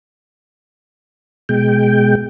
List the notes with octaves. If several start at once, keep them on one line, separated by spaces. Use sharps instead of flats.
B2 G#3 G5